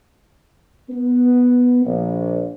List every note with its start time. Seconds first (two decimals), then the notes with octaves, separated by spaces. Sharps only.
0.90 B3
1.84 A#1